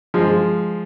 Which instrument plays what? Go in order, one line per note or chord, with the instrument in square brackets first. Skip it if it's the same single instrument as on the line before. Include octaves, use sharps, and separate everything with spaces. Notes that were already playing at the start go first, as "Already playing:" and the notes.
[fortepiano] F3 G#3